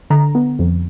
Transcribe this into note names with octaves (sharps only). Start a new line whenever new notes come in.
D3 A#5
B3
F2